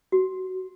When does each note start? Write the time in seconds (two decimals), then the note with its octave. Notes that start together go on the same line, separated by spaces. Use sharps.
0.12 F#4